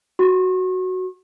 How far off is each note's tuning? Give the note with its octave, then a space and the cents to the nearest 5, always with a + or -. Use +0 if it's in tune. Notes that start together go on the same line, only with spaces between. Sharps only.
F#4 +5 C#6 -40